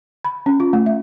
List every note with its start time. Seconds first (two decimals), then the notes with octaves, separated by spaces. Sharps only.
0.25 B5
0.46 C#4
0.60 F4
0.73 A3
0.86 E5